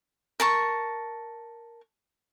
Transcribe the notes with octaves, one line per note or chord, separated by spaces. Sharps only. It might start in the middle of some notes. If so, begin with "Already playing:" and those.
A#4 A5 C#6